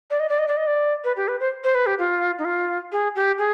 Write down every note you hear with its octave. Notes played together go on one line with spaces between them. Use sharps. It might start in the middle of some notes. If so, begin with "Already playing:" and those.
D5
D#5
D5
D#5
D5
D#5
D5
B4
G4
B4
C5
C5
B4
G4
F4
D#4
F4
G#4
G4
G#4